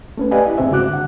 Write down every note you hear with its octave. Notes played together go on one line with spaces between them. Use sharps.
A3 C#4 B4
G4 B4 D5 D#5 F5 G#5
E4
D#2 G#2 C4 G#4 C5 E5
C#3 G#3 F#4 D6 F#6
D3 F#5